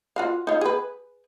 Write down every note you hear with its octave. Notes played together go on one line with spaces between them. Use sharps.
F4 F#4 F5
D#4 F4
G#4 B4